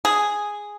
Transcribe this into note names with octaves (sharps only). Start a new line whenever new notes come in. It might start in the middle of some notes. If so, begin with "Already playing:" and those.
G#4